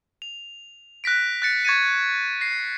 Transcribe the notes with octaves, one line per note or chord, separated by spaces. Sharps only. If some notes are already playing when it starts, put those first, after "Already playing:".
F7
F#6 A#6 B6 D7
F#6 A6 C#7
C#6 G#6 A6 C#7 D#7
A#6 C7